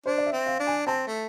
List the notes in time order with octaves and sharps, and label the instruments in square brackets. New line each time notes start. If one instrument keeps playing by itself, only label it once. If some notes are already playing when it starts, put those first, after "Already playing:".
[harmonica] D4 [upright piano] C5
[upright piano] D5
E5
[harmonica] C4
[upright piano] F5
[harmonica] D4
[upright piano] G#5
[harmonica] C4 [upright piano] A5
[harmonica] A3